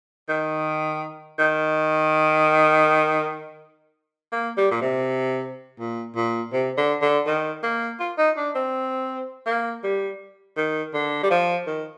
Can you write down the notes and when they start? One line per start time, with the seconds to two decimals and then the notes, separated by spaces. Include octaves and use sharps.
0.29 D#3
1.39 D#3
4.32 A#3
4.57 G3
4.71 A#2
4.82 C3
5.80 A#2
6.16 A#2
6.53 C3
6.77 D3
7.02 D3
7.26 D#3
7.63 A#3
8.00 F4
8.18 D#4
8.37 D4
8.55 C4
9.47 A#3
9.84 G3
10.57 D#3
10.94 D3
11.23 G3
11.30 F3
11.67 D#3